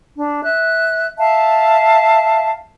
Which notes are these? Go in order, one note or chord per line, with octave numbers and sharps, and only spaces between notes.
D4
E5 F#6
E5 F5 A5